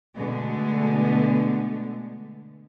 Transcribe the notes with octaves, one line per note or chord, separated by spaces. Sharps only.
B2 D3 G#3 A3 B3